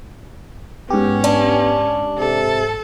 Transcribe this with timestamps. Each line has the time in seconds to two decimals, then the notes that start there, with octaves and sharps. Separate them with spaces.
0.90 G#2 B3 C#4 G4
1.24 D4
2.18 C3 A4